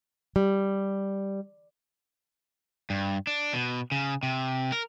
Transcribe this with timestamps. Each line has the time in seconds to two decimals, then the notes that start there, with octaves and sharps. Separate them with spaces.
0.36 G3
2.90 G2
3.27 D4
3.53 B2
3.92 C#3
4.23 C3
4.72 A#4